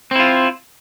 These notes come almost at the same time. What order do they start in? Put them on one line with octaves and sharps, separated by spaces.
C4 E4 F4